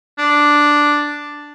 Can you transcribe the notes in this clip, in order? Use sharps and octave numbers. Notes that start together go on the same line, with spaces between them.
D4